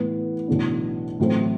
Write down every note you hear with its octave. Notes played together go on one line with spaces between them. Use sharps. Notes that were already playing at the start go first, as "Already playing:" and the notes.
Already playing: A2 E3 B3
B1 A2 E3 B3 D4
A1 A2 F#3 A3 C4